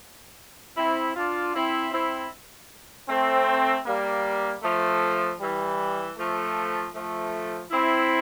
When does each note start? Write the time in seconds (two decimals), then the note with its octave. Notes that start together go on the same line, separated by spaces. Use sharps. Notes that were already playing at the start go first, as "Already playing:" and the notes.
0.77 C4 E4
1.16 D4 F4
1.54 C4 E4
1.93 C4 E4
3.08 A3 C4
3.86 G3 A#3
4.62 F3 A3
5.40 E3 G3
6.18 F3 A3
6.94 F3 A3
7.71 C4 E4